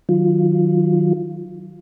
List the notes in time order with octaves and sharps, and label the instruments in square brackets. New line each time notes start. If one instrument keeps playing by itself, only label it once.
[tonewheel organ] D#3 F#3 F4